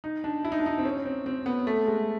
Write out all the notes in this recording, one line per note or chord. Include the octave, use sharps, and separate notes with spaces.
D#4
D4
E4
D#4
D4
D#4
C4
C#4
C4
C4
B3
A3
G#3